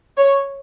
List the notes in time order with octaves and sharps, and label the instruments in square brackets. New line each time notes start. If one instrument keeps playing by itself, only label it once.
[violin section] C#5